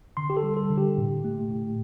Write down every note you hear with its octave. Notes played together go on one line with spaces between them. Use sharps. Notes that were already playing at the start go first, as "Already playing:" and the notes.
D3 C6
G4
A4
G3
A4
D3
G4
A2
A3
A2